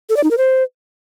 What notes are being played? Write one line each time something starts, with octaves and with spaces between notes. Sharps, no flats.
A4
D5
D#4
A#4
C5